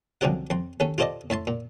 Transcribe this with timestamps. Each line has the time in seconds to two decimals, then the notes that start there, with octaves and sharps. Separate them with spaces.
0.21 C2 F#2 D3 F3 G4 F#5
0.50 F2 C6
0.80 D#2 C#4 A4
0.98 F4 G4 A4 C5 D5 D#5
1.30 A2 E5 A5 C6
1.47 A#2